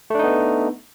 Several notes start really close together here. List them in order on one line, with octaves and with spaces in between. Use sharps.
A3 D4 D#4 B3